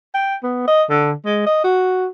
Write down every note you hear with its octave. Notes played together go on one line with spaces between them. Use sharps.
G5
B3
D#5
D3
G#3
D#5
F#4